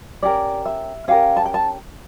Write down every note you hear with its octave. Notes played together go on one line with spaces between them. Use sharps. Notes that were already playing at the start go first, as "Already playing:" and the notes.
C#4 G4 A#4 D5
E5
C#4 G4 A#4 F5
A5
G5
A5